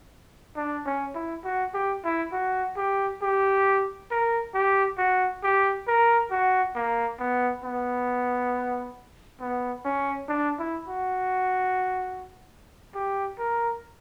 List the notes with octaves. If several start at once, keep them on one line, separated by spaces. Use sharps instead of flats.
D4
C#4
E4
F#4
G4
E4
F#4
G4
G4
A#4
G4
F#4
G4
A#4
F#4
A#3
B3
B3
B3
C#4
D4
E4
F#4
G4
A#4